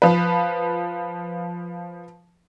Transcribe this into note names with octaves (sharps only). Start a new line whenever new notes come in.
F3 B4